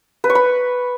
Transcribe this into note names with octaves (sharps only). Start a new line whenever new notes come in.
B4
C#6
B5